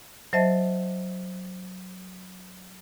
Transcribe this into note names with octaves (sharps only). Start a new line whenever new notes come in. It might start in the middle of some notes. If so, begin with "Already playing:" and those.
F#3 C5 D#5 E5 A5 A6